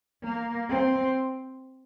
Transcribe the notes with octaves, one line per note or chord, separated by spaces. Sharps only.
A#3
C4